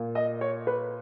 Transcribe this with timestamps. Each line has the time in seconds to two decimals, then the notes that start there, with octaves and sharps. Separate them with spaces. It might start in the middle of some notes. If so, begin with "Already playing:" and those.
Already playing: A#2 A#3
0.15 D#5
0.41 C#5
0.67 B4